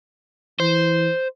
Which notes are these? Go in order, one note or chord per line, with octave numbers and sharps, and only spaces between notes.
E3 C5